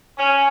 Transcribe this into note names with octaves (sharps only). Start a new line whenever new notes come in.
C#4